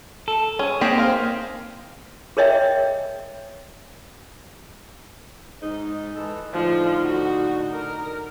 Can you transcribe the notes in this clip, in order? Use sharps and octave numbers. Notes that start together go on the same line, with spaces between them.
A4
C#4 G#4
A#3 C4 G4 G#4
C5 F5
G#4 A#4 C#5 D#5 E5 G5
G#2 D#4
E3 G#3 A4
A2 D3 F3 D#4
F#4
A#4